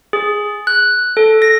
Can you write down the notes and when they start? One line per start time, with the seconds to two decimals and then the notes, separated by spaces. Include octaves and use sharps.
0.13 G#4
0.67 F#6
1.17 A4
1.42 A#6